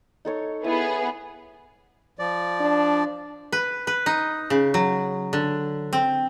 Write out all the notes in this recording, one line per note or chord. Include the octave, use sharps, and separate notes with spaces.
D#4 A4 C#5
B3 E4 G#4
F3 D5
D4
B4
B4
D#4
C#3
F#3
D3
C4